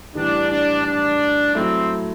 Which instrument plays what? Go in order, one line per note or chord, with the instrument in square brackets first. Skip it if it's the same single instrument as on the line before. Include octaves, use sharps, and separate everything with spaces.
[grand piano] A2 E3 G3 [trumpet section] D4
[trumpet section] D4
D4
[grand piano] F#3 A3 E4 A4 [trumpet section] C4